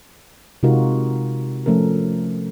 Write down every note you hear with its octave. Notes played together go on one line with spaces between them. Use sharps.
C3 G#3 D#4 F4 F#4 A#4
F3 A3 C#4 A4 A#4